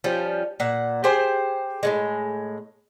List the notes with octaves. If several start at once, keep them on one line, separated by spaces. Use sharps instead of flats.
F3 G3 C#4
A#2 F#5
G4 G#4 C5 G5
A2 D3 G#3